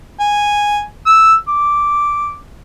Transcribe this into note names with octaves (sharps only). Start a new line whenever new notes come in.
G#5
E6
D6